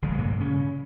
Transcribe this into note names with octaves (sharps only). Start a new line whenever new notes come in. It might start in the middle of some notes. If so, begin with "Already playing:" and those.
A#1 D3 F3 G#3
G2 A#2 A#3
C#3 C#4